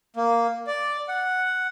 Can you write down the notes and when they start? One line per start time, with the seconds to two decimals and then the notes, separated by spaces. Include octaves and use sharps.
0.16 A#3
0.67 D5
1.08 F#5